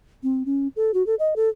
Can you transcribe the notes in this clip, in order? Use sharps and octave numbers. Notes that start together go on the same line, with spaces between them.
C4
C#4
A4
F#4
A4
D#5
A4